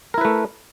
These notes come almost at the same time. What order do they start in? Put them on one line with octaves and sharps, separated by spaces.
A#4 E4 B4 A3